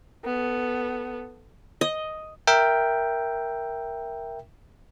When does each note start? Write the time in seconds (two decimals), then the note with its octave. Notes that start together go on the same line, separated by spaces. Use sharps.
0.25 B3 A4
1.81 D#5
2.47 A#4 E5 G5